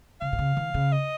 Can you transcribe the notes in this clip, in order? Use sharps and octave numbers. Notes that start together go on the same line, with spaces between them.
C#3 F5
B2
C#3
D#3
C#3
D#5